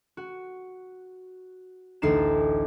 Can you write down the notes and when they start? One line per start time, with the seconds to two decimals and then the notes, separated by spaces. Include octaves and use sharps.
0.17 F#4
2.02 A1 D2 D#4 C7 E7